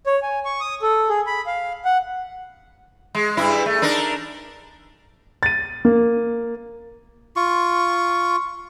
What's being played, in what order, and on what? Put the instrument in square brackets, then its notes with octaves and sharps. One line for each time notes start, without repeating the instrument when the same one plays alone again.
[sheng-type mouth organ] C#5
G#5
C#6
D#6
A4
G#4
B5
F5
F#5
[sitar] G#3
G2 E4
A3
D4 D#4 A#4
[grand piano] A6 D#7
A#3
[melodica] F4 C#6